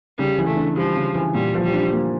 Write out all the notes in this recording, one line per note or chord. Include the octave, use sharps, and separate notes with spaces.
C#3 G3
E3
A3
D4
F3 G3
C#3
E3
A#2 G3
F3
G3
D4
A#3